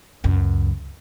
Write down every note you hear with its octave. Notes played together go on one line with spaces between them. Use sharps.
C#2 F#2